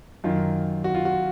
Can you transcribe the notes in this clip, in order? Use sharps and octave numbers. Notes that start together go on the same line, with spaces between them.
F#2 D#3 F4
F#4
F4
F#4